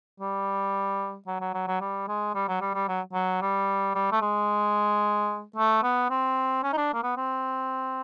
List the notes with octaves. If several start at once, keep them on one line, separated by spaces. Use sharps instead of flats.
G3
F#3
F#3
F#3
F#3
G3
G#3
G3
F#3
G3
G3
F#3
F#3
G3
G3
A3
G#3
A3
B3
C4
C#4
D#4
D4
A#3
B3
C4